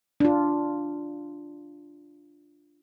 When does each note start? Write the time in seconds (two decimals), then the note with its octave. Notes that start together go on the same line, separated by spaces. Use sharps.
0.20 D4 F4